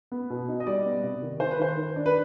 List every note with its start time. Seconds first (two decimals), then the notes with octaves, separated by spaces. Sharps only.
0.12 B3
0.30 B2
0.48 D#4
0.60 D#5
0.67 G3 D5
0.85 B3
1.04 C3
1.22 D#3
1.40 D#3 C5
1.51 B4
1.59 D#3 C5
1.77 D#3
1.96 D4
2.06 B4